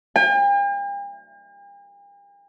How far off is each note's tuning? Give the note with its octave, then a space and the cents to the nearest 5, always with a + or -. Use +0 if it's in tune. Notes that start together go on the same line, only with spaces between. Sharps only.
G5 +45